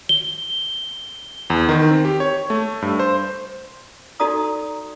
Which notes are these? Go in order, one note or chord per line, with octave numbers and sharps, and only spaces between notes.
G7
E2
D#3
C4
G4
C#5
A3
G2
C5
D#4 F#4 A4 D5 A#5 D#6